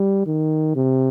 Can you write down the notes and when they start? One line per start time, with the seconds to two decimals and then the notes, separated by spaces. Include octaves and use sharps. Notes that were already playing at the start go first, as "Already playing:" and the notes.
Already playing: G3
0.27 D#3
0.76 C3